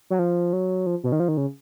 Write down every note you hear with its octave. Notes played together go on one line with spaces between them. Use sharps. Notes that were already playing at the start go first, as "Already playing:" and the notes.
F#3
F3
F#3
F3
B2
D#3
F3
D#3
C#3